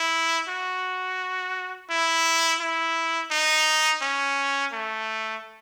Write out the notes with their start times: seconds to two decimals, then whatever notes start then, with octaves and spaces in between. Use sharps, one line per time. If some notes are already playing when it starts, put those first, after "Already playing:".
Already playing: E4
0.48 F#4
1.90 E4
2.60 E4
3.31 D#4
4.02 C#4
4.73 A3